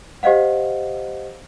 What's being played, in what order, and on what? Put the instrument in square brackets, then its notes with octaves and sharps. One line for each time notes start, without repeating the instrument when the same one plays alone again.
[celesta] G4 C5 D#5 F5 F#5